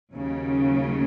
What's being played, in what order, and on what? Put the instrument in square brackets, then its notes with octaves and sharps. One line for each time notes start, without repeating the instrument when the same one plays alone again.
[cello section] D#2 C#3 F#3